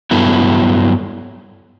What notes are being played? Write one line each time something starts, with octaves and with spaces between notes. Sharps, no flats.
G2 F#3 B3 E4 A4